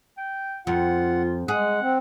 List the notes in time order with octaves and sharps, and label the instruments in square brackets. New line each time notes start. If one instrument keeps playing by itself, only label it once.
[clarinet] G5
[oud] F2 [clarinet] F4 [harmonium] F#5
[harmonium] G#3 [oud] G#4 [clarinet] F#5
[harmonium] C4